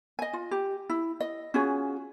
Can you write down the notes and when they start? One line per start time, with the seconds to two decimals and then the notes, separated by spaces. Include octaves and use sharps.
0.19 D#5 G#5
0.33 F4
0.51 G4
0.90 E4
1.20 D#5
1.54 C#4 F4 F#4 G#4